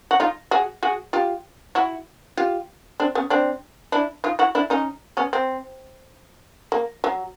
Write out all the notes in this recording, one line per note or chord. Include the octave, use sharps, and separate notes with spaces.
F#4
D#4 F4
F#4 G#4
F#4 G#4
F4 G4
E4 F#4
F4 G4
C4 D4
B3 C#4
C4 D4
D4 E4
D#4 F4
E4 F#4
D4 E4
C#4 D#4
B3 C#4
C4
A#3
F#3